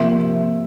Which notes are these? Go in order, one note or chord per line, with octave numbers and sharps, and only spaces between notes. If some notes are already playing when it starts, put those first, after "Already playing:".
Already playing: C3 F3 A#3 E5